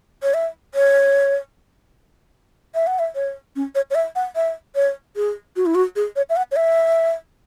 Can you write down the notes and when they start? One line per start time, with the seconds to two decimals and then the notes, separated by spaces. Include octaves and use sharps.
0.23 C#5
0.34 E5
0.74 C#5
2.74 E5
2.87 F#5
2.99 E5
3.15 C#5
3.56 C#4
3.75 C#5
3.90 C#5
3.95 E5
4.15 F#5
4.35 E5
4.75 C#5
5.16 G#4
5.56 F#4
5.66 E4
5.75 F#4
5.96 G#4
6.16 C#5
6.29 E5
6.36 F#5
6.51 C#5
6.56 E5